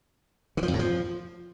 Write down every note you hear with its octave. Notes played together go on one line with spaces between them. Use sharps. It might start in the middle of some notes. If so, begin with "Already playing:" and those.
D3
F3
F2
A2
F3